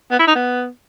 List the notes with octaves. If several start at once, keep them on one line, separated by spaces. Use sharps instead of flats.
B3
E4
D#4
B3